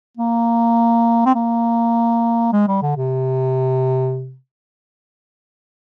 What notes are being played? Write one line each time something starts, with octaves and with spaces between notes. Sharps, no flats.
A#3
C4
A#3
G#3
G3
D3
C3